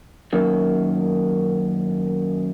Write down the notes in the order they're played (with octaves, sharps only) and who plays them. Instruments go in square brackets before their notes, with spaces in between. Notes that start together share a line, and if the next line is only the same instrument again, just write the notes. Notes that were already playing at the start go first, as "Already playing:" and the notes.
[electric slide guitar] F#2 D#3 A#3